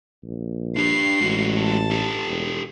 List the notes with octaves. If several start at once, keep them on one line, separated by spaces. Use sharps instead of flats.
A#1
D4 G4 C7
A1 G#3 F#4
A5
G4 A4
E1